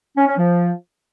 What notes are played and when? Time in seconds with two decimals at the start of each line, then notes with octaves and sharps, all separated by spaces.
0.17 C#4
0.27 C#4
0.37 F3